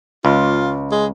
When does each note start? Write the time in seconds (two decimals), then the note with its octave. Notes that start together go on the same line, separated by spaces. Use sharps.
0.25 C#2 F4
0.91 G#3